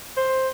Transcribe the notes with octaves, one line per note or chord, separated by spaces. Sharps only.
C5